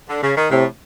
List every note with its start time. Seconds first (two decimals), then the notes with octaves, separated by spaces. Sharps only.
0.08 D3
0.22 C#3
0.37 D#3
0.51 A2 C3